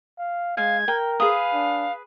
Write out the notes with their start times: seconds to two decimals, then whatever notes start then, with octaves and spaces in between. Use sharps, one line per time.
0.19 F5
0.57 G#3 F5 G#6
0.88 A#4 G5
1.20 G#4 B4 F5 D#6
1.54 D4